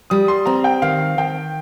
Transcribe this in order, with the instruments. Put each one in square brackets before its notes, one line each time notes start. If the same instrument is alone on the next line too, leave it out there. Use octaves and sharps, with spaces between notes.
[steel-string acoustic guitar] G3 [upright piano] D#6
[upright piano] C6
[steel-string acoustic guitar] C4 [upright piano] A#5
[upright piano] G5
[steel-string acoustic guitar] D#3 [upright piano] F5
[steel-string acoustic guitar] D#3 [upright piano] G5